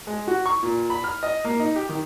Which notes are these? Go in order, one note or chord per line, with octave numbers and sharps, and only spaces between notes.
G#3
F#4
C#6
A#2
B5
F6
D#5
A#3
D#4
G4
D#3